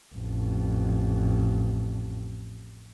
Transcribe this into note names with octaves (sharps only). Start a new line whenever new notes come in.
A1 F2